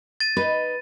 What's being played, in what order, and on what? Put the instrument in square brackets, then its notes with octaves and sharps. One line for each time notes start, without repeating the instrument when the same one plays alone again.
[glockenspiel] A6 D#7
[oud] D#4 D#5 [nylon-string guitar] B4